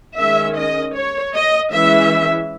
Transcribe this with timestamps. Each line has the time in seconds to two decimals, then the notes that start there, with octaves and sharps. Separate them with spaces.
0.18 D#3 G#3 C#4 E5
0.57 D#5
0.95 C#5
1.34 D#5
1.72 E3 G#3 C#4 E5